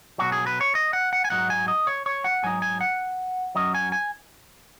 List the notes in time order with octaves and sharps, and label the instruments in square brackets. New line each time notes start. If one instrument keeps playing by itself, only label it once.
[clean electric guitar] B1 B2 F#3 F#4
G#4
B4
C#5
D#5
F#5
F#5
G#5
G#2 F#3 D#4 F#5
G#5
D#5
C#5
C#5
F#5
G#2 F#3 D#4 G#5
G#5
F#5
F#2 F#3 C#4 D#5
G#5
G#5